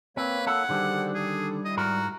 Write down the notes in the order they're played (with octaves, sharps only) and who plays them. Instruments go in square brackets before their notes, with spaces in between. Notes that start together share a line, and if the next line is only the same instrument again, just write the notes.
[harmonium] A#3 C#5 [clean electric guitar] C4 [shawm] B4
[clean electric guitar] E4 A4 [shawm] F#5
[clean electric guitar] D3 D#3 D4 [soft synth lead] G3 [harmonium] G#4 A4 C5
[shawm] G#4 [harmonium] A4
[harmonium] E4 [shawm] D#5
[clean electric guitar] G#2 A#4 [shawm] F#4